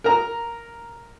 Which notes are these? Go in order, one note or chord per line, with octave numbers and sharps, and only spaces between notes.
A#4 A#5